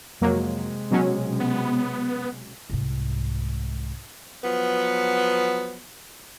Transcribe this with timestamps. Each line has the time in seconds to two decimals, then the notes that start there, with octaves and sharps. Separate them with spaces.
0.21 F2 C3 F#3 G#3 A#3
0.91 B2 F#3 C#4
1.40 B3
2.70 C2 G#2
4.44 F3 F#3 B3